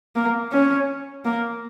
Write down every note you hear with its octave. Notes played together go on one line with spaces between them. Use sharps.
A#3
C#4
A#3